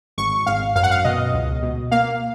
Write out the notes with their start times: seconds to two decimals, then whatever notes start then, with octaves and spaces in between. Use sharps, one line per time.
0.18 G#1 C#6
0.46 G#1 F5
0.75 F#2 F5
0.83 F#5
0.91 F5
1.04 B2 D#5
1.33 C#2
1.63 B2
1.91 A#3 F5